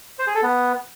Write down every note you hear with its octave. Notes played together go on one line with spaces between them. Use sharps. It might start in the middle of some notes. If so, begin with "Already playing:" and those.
C5
G#4
A4
B3